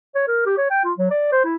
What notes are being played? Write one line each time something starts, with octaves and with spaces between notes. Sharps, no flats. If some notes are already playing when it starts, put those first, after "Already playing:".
C#5
A#4
G4
C#5
G5
F4
F#3
D5
C5
E4